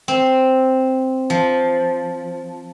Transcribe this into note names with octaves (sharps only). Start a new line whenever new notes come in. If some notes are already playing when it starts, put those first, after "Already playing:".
C4
F3